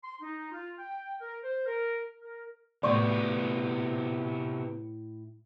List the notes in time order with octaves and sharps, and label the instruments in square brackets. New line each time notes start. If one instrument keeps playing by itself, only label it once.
[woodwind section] C6
D#4
F4
G5
A#4
C5
A#4
A#4
[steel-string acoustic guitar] A2 E4 [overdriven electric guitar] C3 B3 [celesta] D5 C6 C#6